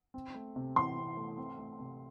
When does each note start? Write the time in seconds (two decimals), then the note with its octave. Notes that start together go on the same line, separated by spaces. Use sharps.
0.14 C4
0.34 A3
0.56 C3
0.76 E3 C6
0.97 C4
1.17 A3
1.37 C4
1.58 A3
1.79 C3